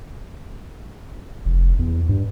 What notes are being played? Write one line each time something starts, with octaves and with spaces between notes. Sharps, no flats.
F1
E2
G2